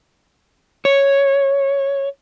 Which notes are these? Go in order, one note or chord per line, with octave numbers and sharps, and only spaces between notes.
C#5